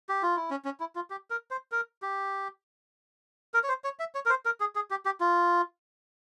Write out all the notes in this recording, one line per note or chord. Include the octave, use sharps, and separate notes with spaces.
G4
F4
E4
C#4
C#4
E4
F4
G4
A#4
C5
A#4
G4
A#4
C#5
C5
C#5
E5
C#5
A#4
C5
A#4
G#4
G#4
G4
G4
F4